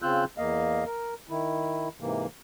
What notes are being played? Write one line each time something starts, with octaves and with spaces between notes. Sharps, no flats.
C#3 C4 F4 E6 F#6 G6
E2 A#3 D#5 F5
A#4
D#3 E4
G#2 C3 E3 A#3